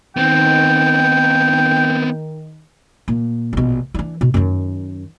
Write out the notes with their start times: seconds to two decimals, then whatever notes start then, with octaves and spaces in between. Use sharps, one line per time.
0.17 D#3 B3 C4 G5
3.08 A#2
3.53 A#1 B2
3.94 E3 D4
4.21 B2
4.34 F#2 D#3